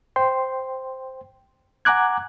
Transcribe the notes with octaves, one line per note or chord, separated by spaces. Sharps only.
C5 G5 C6
F#5 G#5 A#5 D6 F#6 G#6